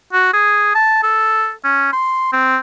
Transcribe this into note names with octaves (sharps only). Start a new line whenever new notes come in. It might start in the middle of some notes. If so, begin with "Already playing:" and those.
F#4
G#4
A5
A4
C#4
C6
C4